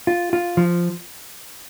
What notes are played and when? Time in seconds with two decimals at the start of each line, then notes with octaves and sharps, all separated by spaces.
0.07 F4
0.33 F4
0.57 F3